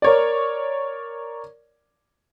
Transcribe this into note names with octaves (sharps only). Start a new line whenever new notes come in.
A#4 C#5 D5